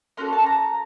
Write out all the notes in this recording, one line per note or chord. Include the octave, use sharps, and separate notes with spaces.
A#3 C#4 F#4 A4 C6
A5
A#5